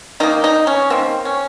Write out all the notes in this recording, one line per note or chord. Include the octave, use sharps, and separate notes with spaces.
D#3 A#3 D#4
D#4
C#4
D#3 A#3 C4
C#4